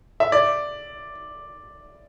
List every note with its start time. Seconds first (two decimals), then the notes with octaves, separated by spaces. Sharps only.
0.20 E5
0.32 D5